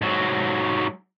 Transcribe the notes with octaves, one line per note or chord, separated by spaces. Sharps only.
G#2 F#3